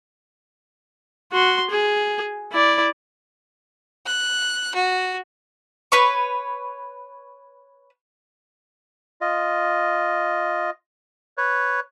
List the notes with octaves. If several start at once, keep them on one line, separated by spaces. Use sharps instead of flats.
F#4 C6
G#4
E4 D5
F#6
F#4
B4 C#5 C#6
F4 D#5
B4 C#5